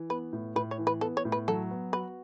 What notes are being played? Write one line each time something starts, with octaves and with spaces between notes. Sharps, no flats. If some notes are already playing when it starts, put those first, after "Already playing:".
Already playing: E3
B3 B4
A2
A2 B4
C#5
E3
B4
B3 A4
C#5
A2
B4
F#3 A4
B3
F#4 B4